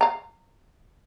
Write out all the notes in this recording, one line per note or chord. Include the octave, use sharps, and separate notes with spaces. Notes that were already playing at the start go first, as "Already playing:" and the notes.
F5 A#5